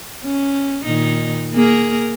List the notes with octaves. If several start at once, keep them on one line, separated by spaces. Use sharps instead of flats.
C#4
A#2 D#3 D#4
A#3 G#4 A#4